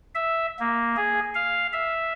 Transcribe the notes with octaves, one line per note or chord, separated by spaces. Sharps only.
E5
A#3
G#4
F5
E5